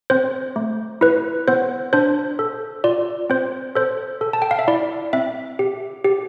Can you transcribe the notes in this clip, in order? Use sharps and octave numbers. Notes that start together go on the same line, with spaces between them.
C4 C5
A3
E4 B4
B3 C5
D4 C5
A4
F4 D5
C4 C5
A4 C5
A4
A5
G5
F5
E5
E4 D5
C4 E5
G4
G4